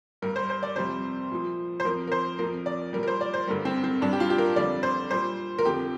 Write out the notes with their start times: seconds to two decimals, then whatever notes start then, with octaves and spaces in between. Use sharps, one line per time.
0.22 G2 G3 A#4
0.36 C5
0.50 C5
0.63 D5
0.76 F2 C3 G3 C5
1.31 A#2 F3
1.80 C5
1.84 F2 F3 A#4
2.07 A#4
2.12 C5
2.39 F2 F3 A#4
2.66 D5
2.93 G3 A#4
2.97 A#2
3.03 A#4
3.08 C5
3.21 D5
3.34 C5
3.47 G2 D3 G3 A#4
3.65 C4
3.84 C4
4.01 G2 G3 D4
4.13 G4
4.20 F4
4.30 G4
4.38 A#4
4.56 F2 D3 G3 D5
4.83 C5
5.11 A#2 G3 C5
5.59 A#4
5.65 F2 D3 F3 G4